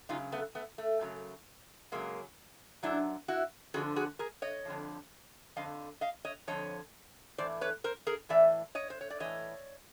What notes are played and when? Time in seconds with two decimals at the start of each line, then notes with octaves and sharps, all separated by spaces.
0.09 F#2 C#3 F#3 D#4 F4
0.32 A3 B3
0.55 A3 B3
0.78 A3
1.01 F#2 C#3 F#3
1.92 F#2 C#3 F#3 G#3 A#3
2.83 F#2 C#3 F#3 D4 E4
3.28 E4 F#4
3.74 F2 D3 F3 F#4 G#4
3.96 F#4 G#4
4.19 G#4 A#4
4.42 C#5 D#5
4.65 F2 D3 F3
5.56 F2 D3 F3 D#5 F5
6.01 D#5 F5
6.25 C#5 D#5
6.47 F2 D3 F3 C#5 D#5
7.38 A2 E3 C5 D5
7.61 B4 C#5
7.84 A#4 C5
8.07 G#4 A#4
8.29 A2 E3 D5 E5
8.75 C#5 D#5
8.90 C5
9.01 C#5
9.10 D5
9.20 A2 E3 C#5 D#5